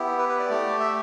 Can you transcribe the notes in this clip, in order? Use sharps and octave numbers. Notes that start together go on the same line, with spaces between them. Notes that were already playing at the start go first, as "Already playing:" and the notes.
Already playing: B3 E4 G4
B4
B4
D5
A3 G4
E5